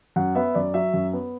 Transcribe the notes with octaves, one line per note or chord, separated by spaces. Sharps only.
F#2 F#5
B3 E5
F#2 D5
F#3 E5
F#2
B3